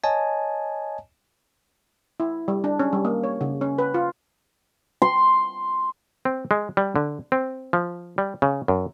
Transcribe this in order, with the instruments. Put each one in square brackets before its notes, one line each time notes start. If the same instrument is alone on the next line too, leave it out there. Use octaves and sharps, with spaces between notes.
[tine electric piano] C#5 D#5 G#5 A5
[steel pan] E4
G3
D4
C#4
G3
A#3
C#5
C#3
C#4
B4
F4
[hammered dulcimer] C6
[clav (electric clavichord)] C4
G#3
G3
D3
C4
F3
G3
C#3
F#2